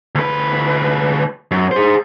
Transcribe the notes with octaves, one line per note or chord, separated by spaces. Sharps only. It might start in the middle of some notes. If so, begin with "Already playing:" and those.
D2 B4
F#2
G#4 C5